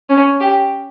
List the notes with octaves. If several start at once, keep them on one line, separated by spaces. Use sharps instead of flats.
C#4
G4